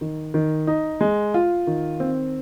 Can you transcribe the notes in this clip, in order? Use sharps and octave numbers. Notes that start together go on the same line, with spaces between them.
D#3
D#3
D#4
G#3
F4
D#3
C4